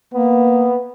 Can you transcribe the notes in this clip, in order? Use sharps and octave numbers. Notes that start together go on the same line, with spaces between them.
A#3 B3